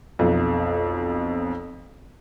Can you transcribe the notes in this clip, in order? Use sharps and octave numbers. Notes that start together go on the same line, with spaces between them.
B1 F2